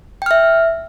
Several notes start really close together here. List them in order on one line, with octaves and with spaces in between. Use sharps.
G5 F6 E5